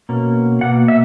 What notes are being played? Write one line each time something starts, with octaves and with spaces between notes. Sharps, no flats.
B2 A#3 C#4
B2 A#3 F#5
E5